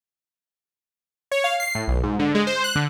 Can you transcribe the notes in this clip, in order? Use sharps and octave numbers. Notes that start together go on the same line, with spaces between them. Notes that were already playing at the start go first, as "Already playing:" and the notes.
C#5
F5
C7
A2
B1
G#2
D3
G#3
C5
F#6
D3